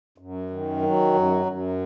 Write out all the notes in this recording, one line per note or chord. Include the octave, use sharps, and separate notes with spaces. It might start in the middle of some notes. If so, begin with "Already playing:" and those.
F#2
D#3
F#3
F#2
F#2